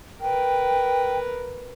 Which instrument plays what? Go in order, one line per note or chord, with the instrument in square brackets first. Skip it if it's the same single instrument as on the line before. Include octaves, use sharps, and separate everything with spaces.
[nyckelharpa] A#4 B4 [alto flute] G5